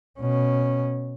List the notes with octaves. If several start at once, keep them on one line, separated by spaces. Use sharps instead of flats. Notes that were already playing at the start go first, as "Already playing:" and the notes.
B2 C#4